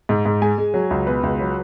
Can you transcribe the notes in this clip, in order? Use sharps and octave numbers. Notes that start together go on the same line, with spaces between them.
G#2
G#2
G#3 G#5
G#3
F#3
C#2
B2 B4
C#2
F#3